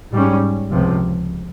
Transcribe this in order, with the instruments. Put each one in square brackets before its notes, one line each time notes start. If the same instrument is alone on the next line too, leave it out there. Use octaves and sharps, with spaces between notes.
[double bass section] G#2 G3 C#4
C#2 C3 F3